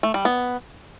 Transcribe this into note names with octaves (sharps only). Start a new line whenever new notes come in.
A3
G3
B3